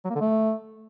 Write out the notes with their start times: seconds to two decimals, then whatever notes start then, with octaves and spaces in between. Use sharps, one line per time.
0.05 F#3
0.10 A#3
0.15 D3
0.21 A3